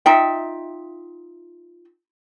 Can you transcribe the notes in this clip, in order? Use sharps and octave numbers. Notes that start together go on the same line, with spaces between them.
D#4 F4 E5 G5